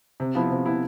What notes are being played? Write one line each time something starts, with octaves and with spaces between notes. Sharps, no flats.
C3
F3 B3 E4
C3
F3 B3 E4